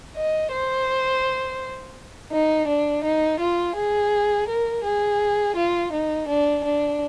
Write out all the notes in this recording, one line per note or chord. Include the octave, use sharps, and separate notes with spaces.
D#5
C5
D#4
D4
D#4
F4
G#4
A#4
G#4
F4
D#4
D4
D4